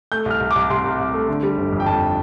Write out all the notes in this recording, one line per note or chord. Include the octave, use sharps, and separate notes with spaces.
A3 G6
C2
F6
C2
D6
C2
C3 C6
C2
C2
A3
D3
G3
G1
F2
G5
F2 A5